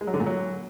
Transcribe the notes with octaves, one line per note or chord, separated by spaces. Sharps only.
G#3
F#3
D3
A#2
F#3